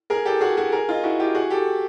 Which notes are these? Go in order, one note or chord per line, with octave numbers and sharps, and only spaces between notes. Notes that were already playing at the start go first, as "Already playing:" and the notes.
G#4 A#4
G4 A4
F#4 G#4
F#4 G#4
G#4 A#4
D#4 F4
E4 F#4
F4 G4
F#4 G#4
G4 A4